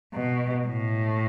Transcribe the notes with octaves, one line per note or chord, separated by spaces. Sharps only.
B2
A2